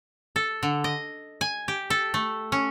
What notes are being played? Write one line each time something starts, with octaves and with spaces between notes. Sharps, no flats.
A4
D3
D#5
G#5
G4
A4
A3
C#4